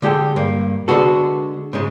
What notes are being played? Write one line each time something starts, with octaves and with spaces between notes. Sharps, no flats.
D3 G#3 G4 A4 G5
G2 A#3
D3 G#3 B3 F#4 A4
G#2 C#3 G#3